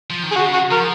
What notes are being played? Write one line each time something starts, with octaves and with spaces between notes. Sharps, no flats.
F3
D#3
G#4
C#3 F#4
F#4
F3 A#4